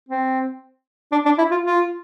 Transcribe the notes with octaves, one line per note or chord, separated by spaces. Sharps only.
C4
D4
D4
E4
F4
F4